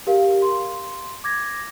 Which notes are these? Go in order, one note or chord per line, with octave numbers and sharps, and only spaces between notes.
G4 A#4 F5
C6
D6 G#6 A#6